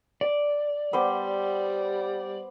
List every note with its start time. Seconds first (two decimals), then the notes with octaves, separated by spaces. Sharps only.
0.21 D5
0.93 G3 B3 C5 D6